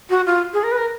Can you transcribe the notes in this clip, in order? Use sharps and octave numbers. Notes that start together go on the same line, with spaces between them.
F#4
F4
G#4
A#4
B4
A#4